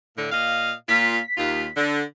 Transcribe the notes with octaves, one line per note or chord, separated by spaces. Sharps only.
A2 D3
A#2 D#5 F5
A#2 F4 B6
D#2 F4
D3